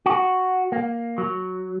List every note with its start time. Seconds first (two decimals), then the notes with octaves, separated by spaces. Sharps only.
0.06 F#4
0.72 A#3
1.18 F#3